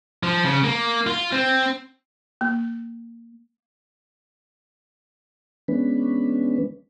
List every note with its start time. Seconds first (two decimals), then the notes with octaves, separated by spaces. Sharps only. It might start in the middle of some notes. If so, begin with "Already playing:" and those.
0.23 F3
0.45 C#3
0.64 A#3
1.07 F4
1.32 C4
2.41 A#3
5.68 E3 G#3 B3 C#4 D4 B4